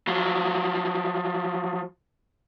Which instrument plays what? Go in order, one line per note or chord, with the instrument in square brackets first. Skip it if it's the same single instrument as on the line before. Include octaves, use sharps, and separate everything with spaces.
[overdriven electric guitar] F3 F#3